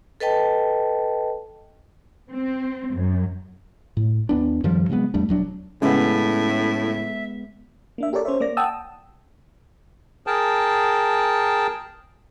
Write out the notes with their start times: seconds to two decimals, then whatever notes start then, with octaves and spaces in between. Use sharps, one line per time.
0.20 A4 B4 D#5 G5 A5
2.32 C4
2.96 F#2
3.97 A2
4.29 D#2 B3 D4
4.64 F#2 D#3 F3 G3
4.90 C3 F#3 G#3 B3
5.14 E2 G3 A3 D4
5.29 E1 F#3 D4
5.82 A2 C#3 G#3 B3 E5
7.98 A#3 D4 E5
8.13 G4 A4 A#4 C#5 D5
8.25 C#4 C5 C#5 E5
8.40 A#3 D5 A#6
8.57 F#5 G5 A5 D#6 E6
10.27 G#4 A#4 G5 A5